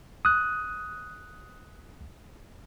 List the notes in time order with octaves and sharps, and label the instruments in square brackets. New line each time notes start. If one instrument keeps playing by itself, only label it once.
[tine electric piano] D#6 F#6